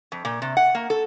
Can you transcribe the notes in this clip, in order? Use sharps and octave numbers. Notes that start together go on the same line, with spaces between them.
F2
A#2
C3
F#5
A#3
A4